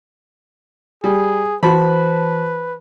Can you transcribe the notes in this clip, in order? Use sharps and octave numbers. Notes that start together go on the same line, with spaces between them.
G3 G#4
E3 F#4 B4 C5 A5 B5